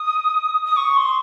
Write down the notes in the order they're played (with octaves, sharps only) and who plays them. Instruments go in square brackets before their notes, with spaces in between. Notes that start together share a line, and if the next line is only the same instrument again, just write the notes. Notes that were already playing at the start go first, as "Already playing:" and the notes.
Already playing: [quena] D#6
D#6
C#6
C6